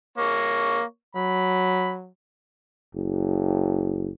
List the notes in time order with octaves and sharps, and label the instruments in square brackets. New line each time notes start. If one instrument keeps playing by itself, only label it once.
[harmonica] A#3 C#5
[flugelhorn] F#3 [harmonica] B5
[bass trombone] F#1